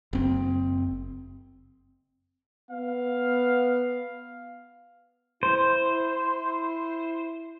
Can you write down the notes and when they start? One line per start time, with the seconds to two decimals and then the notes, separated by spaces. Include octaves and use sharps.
0.13 F#1 C4
2.71 B3 F5
5.43 E4 C5